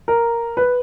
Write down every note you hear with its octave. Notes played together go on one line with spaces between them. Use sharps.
A#4
B4